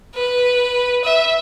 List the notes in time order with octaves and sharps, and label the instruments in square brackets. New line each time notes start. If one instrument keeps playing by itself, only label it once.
[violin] B4
E5